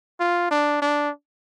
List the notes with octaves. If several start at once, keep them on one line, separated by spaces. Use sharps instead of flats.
F4
D4
D4